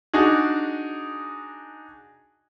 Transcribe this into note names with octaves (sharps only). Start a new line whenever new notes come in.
D4 D#4 F#4 G#4